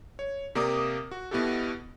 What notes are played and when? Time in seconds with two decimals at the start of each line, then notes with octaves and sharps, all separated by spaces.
0.19 C#5
0.55 C3 A#3 A#4 D5 D6 D#6
1.11 F#4
1.31 B2 B3 E4 F#4 G4 A4